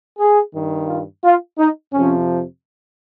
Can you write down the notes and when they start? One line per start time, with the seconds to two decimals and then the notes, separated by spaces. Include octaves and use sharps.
0.19 G#4
0.54 G2 D#3
0.89 F4
1.24 F4
1.58 D#4
1.93 F2 C3 F3 C#4